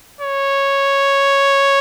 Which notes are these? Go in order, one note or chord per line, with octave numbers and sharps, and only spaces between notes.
C#5